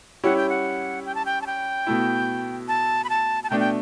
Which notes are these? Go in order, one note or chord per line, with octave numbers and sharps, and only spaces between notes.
G3 C#4 E4 G4 F#5
G5
F#5
G5
A5
G5
A5
G5
B2 A3 E4
A5
B5
A5
A5
B2 A3 D4 G5
G5